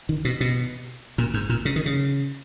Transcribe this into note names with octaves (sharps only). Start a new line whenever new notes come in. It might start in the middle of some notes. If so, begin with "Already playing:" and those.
D#3
B2
B2
A#2
G#2
A#2
C#3
D#3
C#3